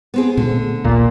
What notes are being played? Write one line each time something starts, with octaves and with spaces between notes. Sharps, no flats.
B3 C4 G#4
A#2 D3 A3 D4
A#1 D#2 A#2